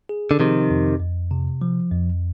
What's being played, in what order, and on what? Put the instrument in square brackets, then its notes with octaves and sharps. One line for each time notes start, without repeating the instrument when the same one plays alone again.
[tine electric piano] G#4
[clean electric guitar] D3
[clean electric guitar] C3 D#3 [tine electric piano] F3
[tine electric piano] F2
F2
C3
F3
F2